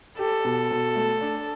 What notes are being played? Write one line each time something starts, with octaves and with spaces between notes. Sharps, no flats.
G4 A4
B2
B2
A3
D4